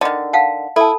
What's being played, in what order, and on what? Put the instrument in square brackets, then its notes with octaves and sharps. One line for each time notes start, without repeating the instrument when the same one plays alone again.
[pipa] D3 D#3 [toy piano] D#5
[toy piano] F5 F#5 A5
[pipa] E4 [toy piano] A4 A5